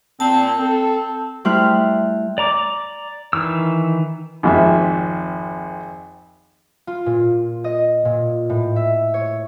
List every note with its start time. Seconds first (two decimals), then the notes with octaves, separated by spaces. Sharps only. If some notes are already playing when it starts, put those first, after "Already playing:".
0.20 A#2 C4 A5
0.59 C4 A4
1.45 G3 A3 E4 C5 F6 F#6
2.38 D5 A#5 D6
3.33 D#3 E3 E6
4.43 G#1 F2 E5
6.87 F4
7.06 A#2
7.64 D#5
8.05 A#2
8.50 A2
8.76 E5
9.14 C#5